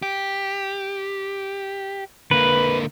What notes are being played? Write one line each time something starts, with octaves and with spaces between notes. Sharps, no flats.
G4
D3 A#3 B4